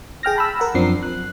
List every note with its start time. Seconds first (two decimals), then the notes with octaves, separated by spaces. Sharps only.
0.23 G#4 G5 F6 A#6
0.36 A5 B5 E6
0.60 A#4 F#5
0.75 F#2 F3 C4 D4 C7
1.03 F#6